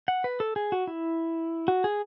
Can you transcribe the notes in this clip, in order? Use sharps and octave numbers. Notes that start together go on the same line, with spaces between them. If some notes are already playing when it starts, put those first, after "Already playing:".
F#5
B4
A4
G#4
F#4
E4
F#4
G#4